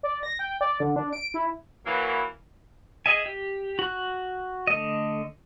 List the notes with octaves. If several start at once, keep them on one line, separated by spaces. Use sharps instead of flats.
D5
A#6
G5
D5
D3
D4
D7
E4
E3 F#3 A#3
G#4 D#5 E5 G#5
G4
F#4 F#6
D3 A3 D#5